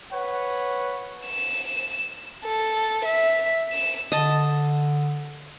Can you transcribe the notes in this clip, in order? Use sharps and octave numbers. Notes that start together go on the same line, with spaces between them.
B4 C#5 F#5
E7
A4
E5
E7
D3 D#5 A5